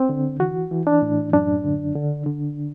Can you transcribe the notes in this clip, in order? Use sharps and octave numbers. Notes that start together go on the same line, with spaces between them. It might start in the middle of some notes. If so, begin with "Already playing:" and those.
Already playing: C4
D3
E3 F#4
E3
D4
A2
F#2 D4
D3
D3
D3